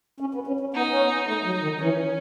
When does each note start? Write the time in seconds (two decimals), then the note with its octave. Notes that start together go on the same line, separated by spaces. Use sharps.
0.20 C#4
0.35 B3
0.47 C#4
0.60 C#4
0.74 B3 D#4
0.89 C#4
1.01 B3
1.27 A3 D#4
1.45 F#3
1.63 D#3
1.81 E3 C#4